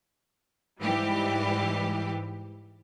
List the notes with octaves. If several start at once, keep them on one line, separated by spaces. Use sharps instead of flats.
G#2 E3 G3 G4